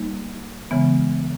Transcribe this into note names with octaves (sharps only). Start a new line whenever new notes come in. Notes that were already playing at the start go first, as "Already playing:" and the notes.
Already playing: G3 A#3 D#4
C#3 E3 G#3 B3